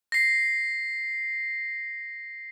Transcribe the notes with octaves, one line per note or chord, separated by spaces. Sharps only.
A#6 C7